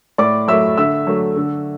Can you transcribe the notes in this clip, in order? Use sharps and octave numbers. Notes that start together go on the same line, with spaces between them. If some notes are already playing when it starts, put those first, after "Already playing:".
A2 D5 D6
F#3 A3 E5 E6
D3 E5 E6
F#3 A3
D3